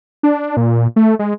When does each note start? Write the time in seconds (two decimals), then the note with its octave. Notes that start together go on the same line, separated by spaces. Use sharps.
0.23 D4
0.57 A#2
0.96 A3
1.19 G#3